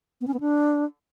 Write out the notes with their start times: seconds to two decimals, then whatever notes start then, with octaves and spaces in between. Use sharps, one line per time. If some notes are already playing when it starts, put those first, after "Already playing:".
0.21 B3
0.27 C#4
0.34 B3
0.40 D4